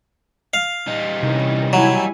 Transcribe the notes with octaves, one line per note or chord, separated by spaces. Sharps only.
F5
G3 D#4
C3 D#3 E3 C#4
F#3 E4 G#5